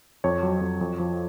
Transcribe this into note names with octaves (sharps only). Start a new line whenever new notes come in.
F2 C#5
F#3
F2
F2
F3